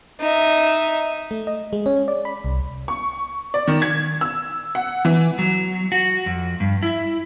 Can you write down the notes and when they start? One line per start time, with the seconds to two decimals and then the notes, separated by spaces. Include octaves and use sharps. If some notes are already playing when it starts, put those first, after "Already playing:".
0.20 D#4 E5
1.31 A3
1.47 D#5
1.73 G#3
1.86 C#4
2.08 D5
2.25 B5
2.44 C2
2.88 C#6
3.54 D5
3.68 D#3
3.82 G#6
4.21 E6
4.75 F#5
5.05 E3
5.39 F#3
5.92 F#4
6.26 F2
6.60 G2
6.83 E4